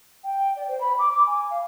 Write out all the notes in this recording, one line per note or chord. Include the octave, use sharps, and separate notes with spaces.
G5
D5
C5
B5
D6
D6
G#5
F5